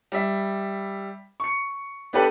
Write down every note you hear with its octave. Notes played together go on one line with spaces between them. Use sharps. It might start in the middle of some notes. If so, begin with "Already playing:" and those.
G3 E5
C#6 C#7
B3 D4 G4 A4 B4